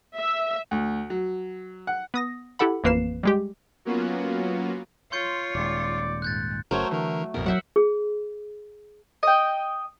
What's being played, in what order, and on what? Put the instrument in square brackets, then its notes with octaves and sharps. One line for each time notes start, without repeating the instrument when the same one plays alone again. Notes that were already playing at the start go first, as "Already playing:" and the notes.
[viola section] E5
[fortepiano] D2
F#3
F#5
[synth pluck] B3 D#6 A#6
E4 G4 A4 F#5 B5
A1 F2 A#3 B4 C7 E7
G3 G#3 G4
[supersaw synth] F#3 A#3 B3 C#4 F4 F#4
[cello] F4 C#5 [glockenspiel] C6 G6 C#7
[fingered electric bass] D#1 G#3 [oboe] D5
[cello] G#2 [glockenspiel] F#6 G6 A6
[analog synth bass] F#1 [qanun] F#3 A3 [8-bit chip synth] A#4 C5 C#5
[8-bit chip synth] D3 A#4 [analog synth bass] E3
[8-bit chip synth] A1 F2 B2 [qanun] A#4
[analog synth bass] F#3 [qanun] C5 E5 F#5
[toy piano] G#4
[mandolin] D#5 G5